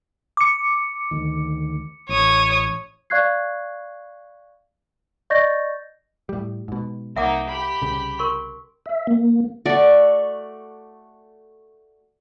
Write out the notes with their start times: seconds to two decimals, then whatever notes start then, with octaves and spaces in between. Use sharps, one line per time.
0.37 D6 C#7
1.11 D2 D#3
2.09 A1 C#5 D#6
3.10 D5 F5 C#6 F#6 G#6 C7
5.30 D5 D#5 C#6 G6 A6 A#6
6.29 A2 G3
6.68 G#2 B2
7.16 C2 A#3 D#4 E5 F#5 D6
7.49 G4 B5
7.81 C2 C#3
8.19 A#4 C6 C#6
8.86 E5
9.07 A#3
9.66 A3 F#4 D5